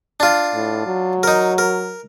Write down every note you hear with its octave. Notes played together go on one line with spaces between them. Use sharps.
D4 F4
A2
F#3
D#4 A#4
A#4